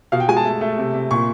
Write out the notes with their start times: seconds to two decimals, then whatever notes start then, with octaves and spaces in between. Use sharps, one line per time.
0.12 B2 F5
0.20 G5
0.29 G#3 G#5
0.37 A5
0.45 A3
0.61 A3
0.78 C3
0.94 C3
1.11 A#2 C#6